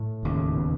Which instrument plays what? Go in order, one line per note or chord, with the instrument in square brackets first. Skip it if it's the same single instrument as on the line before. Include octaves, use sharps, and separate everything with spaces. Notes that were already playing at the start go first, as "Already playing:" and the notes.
Already playing: [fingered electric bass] A2
[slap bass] E1 D#2 C#3
[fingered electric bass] B2